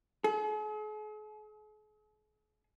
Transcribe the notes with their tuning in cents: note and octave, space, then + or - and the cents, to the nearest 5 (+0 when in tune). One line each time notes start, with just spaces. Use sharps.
G#4 +45